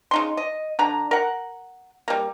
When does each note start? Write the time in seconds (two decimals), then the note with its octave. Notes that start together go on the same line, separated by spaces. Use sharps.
0.11 C#3 D#4 C6
0.37 D#5
0.79 D3 A#5
1.11 A#4 F#5
2.08 G3 A#3